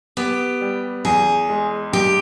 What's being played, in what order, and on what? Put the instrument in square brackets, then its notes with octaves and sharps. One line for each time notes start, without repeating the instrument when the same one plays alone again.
[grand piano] B3 [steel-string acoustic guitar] G4
[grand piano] G3
[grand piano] E2 [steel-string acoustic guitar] G#4
[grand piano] G#3
[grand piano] G2 [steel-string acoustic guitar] G4